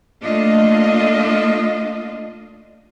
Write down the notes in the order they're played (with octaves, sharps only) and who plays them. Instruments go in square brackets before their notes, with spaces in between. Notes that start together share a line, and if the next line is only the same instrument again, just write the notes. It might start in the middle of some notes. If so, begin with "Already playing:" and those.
[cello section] A3 A#3 D4 F4 D#5